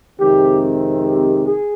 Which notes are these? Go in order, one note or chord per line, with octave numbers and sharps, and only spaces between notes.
F2 C3 D#3 G#3 C4 G4
G4
G#4